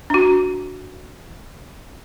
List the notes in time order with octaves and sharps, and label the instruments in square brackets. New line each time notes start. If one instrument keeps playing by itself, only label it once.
[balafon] D4 F#4